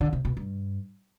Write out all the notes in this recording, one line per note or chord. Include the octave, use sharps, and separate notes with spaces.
D3
C3
B2
G2